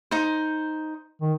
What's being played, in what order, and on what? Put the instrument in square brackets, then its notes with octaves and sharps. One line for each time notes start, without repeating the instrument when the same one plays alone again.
[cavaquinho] D#4 C5
[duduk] D#3